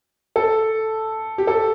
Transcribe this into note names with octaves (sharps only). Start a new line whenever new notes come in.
A4
G4
A4